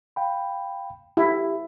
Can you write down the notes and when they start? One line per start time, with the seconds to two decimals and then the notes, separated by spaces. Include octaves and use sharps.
0.16 F5 G5 B5
1.17 E4 G4